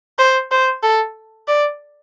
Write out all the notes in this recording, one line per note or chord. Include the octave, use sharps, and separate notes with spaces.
C5
C5
A4
D5